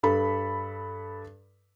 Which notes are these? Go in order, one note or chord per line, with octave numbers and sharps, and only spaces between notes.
G2 A4 B5